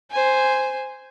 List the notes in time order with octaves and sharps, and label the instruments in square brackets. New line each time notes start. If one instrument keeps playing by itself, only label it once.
[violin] C5 G#5